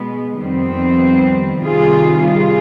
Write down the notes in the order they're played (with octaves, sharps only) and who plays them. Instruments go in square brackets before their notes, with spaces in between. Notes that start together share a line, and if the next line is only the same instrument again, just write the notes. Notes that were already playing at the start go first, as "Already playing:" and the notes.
Already playing: [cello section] B2 G#3 B3
F2 D#3 G3 B3 C4
C3 D#3 G3 F4 G#4
F4 G#4